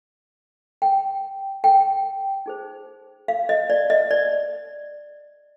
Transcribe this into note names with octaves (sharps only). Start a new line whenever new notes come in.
G5
G5
D#4 G#4 C5
F5
D#5
D5
D#5
D5